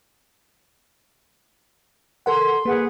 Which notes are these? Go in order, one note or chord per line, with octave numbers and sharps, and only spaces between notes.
A4 A#4 F#5 C6
A#3 G#4 B4 F#5